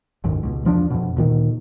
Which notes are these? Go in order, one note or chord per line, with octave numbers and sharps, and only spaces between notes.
F#1 D2 G#2 D#3
C#2 B2
E2 F3 C4 D4
F2 B2
D2 A#2 D#3